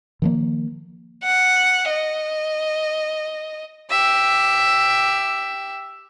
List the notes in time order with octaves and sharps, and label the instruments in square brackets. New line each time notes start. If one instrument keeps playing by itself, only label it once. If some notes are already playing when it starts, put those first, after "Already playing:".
[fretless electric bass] D#3 F3 A#3
[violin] F#5
D#5
[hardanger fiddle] G4 E5